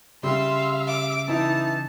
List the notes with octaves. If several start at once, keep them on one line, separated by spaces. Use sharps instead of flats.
C#3 G3 E5 F5 C6
D6
E3 D#4 E4 A5